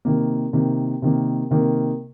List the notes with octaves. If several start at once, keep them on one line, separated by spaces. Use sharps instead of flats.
C3 D#3 A#3
C3 D#3 A#3
C3 D#3 A#3
C3 D#3 A#3